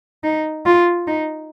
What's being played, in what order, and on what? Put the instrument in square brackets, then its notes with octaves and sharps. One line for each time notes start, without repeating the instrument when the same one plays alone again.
[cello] D#4
F4
D#4